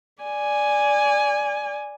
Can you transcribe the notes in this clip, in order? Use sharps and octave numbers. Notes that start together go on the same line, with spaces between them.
D5 G#5